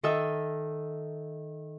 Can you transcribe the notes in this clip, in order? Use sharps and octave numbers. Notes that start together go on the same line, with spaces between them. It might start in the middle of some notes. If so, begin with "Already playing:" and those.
D#3 A4 D#5 E5 E6